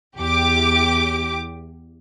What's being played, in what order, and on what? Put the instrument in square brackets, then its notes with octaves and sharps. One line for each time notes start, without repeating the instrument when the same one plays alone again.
[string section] E2 G4 D6